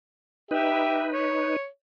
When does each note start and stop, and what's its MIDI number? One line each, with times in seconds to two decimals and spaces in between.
0.51 1.56 63
0.51 1.06 67
0.51 1.56 71
0.51 1.06 76
1.13 1.66 73